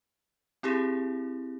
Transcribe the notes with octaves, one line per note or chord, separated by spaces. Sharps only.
C4 E4 G4 G#4